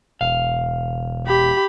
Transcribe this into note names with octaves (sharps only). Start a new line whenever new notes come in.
E1 F5
G4 B5